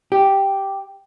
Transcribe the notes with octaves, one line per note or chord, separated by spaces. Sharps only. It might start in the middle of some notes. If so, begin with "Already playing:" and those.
G4